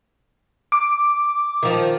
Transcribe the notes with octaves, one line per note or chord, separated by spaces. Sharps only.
D6
D#3 F3